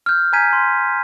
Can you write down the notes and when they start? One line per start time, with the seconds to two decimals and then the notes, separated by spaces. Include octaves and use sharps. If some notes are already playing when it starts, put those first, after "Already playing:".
0.06 F6 G6
0.33 G#5 A#5 G6 G#6 B6 D#7
0.53 C6